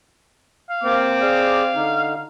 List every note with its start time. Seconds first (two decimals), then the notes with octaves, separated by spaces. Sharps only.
0.70 F5
0.83 A#3 C4 D6
1.22 G#4 D5 F5
1.76 D3 D#4